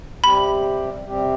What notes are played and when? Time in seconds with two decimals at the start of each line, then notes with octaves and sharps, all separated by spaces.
0.24 C3 G3 C4 G4 B5
1.07 C3 G3 C4 G4